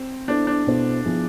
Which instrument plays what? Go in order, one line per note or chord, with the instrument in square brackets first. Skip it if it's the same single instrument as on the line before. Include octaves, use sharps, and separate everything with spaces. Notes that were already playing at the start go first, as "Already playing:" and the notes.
Already playing: [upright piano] C4
[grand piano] B3 E4 A4 C5 [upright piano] D4
[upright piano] D4
[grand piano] B2 B3 E4 A4 C5
F3 B3 E4 G#4